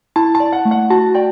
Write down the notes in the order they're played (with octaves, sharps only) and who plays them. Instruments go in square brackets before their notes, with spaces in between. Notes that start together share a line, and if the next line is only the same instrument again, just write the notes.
[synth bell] E4 [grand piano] A5
[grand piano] A5
[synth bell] D5
[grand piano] F#5
[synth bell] A3
[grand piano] F#5
[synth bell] F#4 [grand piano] A5
[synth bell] D5 [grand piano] G5